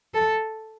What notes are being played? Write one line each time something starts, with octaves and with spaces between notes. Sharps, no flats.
A4